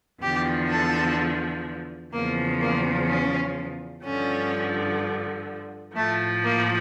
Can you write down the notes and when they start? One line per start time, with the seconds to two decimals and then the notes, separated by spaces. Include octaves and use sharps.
0.22 E2 D3 F3 G4
0.70 A4
2.13 E2 C#3 F3 A#3
2.61 A#3
3.08 C#4
4.04 G2 D3 F3 C#4
5.95 A2 F3 A3
6.44 A#3